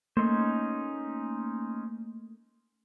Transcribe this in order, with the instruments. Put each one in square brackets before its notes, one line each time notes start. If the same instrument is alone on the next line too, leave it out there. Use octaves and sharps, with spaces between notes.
[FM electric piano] A3 A#3 [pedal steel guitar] C#4 D#4 C5